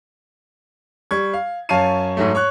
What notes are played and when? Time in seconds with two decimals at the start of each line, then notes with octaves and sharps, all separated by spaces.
1.11 G3 C#6 G#6
1.33 F5
1.69 F#2 C#5 F5 A5 C7 D#7
2.17 G#2 F#3 A3
2.35 C#5 C#6 F#6